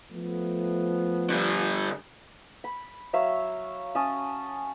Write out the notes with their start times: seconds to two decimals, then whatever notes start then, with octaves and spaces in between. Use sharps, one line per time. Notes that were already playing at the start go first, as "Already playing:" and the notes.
0.11 F3 A3 B3
1.30 D3 G3
2.64 B5
3.13 F#3 C#5 E5 F5
3.95 C#4 A5 D#6